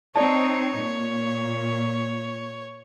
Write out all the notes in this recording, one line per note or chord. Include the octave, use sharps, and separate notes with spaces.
C4 D#4 C#5 D5 A5
A#2